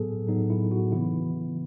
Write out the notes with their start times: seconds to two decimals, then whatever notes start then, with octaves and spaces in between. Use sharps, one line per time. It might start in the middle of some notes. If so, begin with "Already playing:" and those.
Already playing: A2 F#3 B3 G#4 A4
0.27 A2 F#3 B3 D#4
0.50 E4
0.72 F#4
0.92 C#3 E3 B3 E4